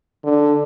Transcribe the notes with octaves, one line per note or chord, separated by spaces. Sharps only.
D3